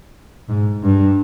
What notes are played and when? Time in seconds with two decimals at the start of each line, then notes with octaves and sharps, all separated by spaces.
0.49 G#2
0.83 G2